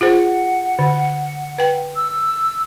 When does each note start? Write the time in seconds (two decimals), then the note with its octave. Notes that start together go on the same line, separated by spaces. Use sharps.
0.01 F4 G#4 C5 F#5
0.79 D3
1.58 B4 G5
1.96 E6